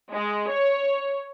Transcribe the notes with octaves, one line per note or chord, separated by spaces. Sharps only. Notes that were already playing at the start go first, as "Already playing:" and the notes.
G#3
C#5